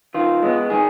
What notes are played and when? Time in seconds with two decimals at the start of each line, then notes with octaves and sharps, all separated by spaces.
0.14 D#3 F4
0.42 G#3 B3
0.70 D#3 G#4